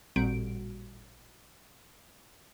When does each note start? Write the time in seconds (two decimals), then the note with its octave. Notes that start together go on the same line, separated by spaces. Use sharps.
0.16 A1 A#2 G3 C4 F#4 D7